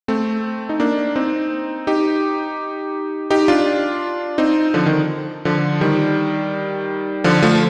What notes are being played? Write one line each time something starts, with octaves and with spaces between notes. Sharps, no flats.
A3 C4
D#4
A#3 D4
C4 D#4
D#4 G4
D#4 G4
D4 F4
C4 D#4
D3 F3
D#3
D3 F3
D#3 G3
D3 F3
F3 A3